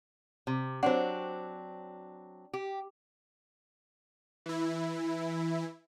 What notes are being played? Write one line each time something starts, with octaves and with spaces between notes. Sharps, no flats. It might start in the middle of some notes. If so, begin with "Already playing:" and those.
C3
F#3 C4 D4 C5 F#5
G4
E3 E4